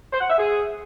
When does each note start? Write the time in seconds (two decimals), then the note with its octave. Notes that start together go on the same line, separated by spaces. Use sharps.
0.12 C5
0.21 F#5
0.30 E5
0.38 G#4